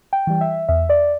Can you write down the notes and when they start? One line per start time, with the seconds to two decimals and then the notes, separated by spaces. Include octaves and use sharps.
0.13 G5
0.27 E3 G3
0.41 E5
0.69 E2 E5
0.89 D5